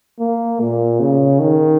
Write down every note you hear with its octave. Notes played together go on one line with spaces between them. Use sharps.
A#3
A#2
C#3
D#3